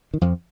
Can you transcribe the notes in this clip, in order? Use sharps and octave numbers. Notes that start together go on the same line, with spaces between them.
D#3
F2 F3